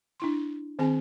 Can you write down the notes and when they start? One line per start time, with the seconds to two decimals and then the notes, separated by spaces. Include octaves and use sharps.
0.20 D4 E4 C6
0.79 D#3 C4 G#4 G#5